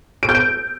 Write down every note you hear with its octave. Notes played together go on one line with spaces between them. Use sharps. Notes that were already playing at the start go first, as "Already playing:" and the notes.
D7
G6
D7